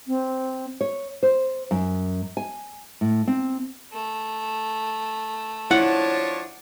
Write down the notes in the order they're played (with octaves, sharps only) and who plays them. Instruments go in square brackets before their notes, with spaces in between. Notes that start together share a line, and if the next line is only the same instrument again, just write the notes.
[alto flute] C4
[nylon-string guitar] C#5
C5
F#2
G#5
A2
C4
[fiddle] A3
[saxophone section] F3 D4 C#5 [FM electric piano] E4 [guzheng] F#5